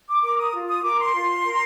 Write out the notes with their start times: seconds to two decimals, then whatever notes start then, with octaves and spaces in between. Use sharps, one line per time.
0.08 D6
0.23 A#4 D6
0.38 D#6
0.54 F4
0.69 D#6
0.83 A#4 D6
0.99 C6
1.14 F4
1.44 A#4